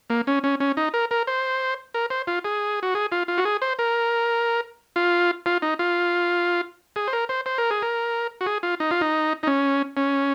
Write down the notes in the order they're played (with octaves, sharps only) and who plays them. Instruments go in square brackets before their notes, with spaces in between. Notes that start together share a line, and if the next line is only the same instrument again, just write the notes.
[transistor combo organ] A#3
C#4
C#4
C#4
D#4
A#4
A#4
C5
A#4
C5
F4
G#4
F#4
G#4
F4
F4
F#4
G#4
C5
A#4
F4
F4
D#4
F4
G#4
C5
A#4
C5
C5
A#4
G#4
A#4
F#4
G#4
F4
D#4
F4
D#4
D#4
C#4
C#4